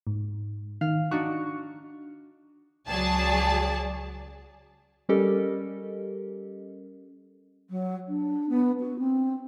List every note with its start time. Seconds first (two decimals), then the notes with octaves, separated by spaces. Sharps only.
0.07 G#2
0.81 D#3 F5
1.11 D4 D#4 F#4 C#6
2.88 C#2 F#3 G#4 D5 A5
5.09 G3 C#4 G4 A4 A#4 D#5
7.70 F#3
8.08 D4
8.49 B3
8.80 F#4
8.99 C4